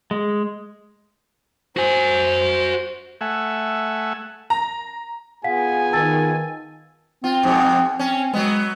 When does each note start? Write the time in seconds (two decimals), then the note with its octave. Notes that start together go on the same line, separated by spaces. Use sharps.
0.11 G#3
1.77 F#4 C5 G#5
3.21 A3 E5 F#5 G#5
4.50 A#5
5.44 B3 F4 G#4 F5 F#5 G#5 B6
5.93 D#3 A5 E6 A6
7.24 C4 F4
7.43 F2 G#2 B2
7.99 C4 C#4
8.34 F#3 G#3 B3